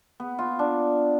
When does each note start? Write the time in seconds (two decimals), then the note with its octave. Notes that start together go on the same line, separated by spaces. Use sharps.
0.20 B3
0.39 F4
0.59 D4